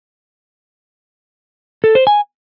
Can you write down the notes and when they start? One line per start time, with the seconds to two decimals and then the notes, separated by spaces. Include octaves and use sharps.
1.84 A4
1.95 C5
2.07 G#5